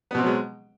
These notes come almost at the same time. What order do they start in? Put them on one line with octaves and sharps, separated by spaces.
B3 B2 C4 F#3 G#3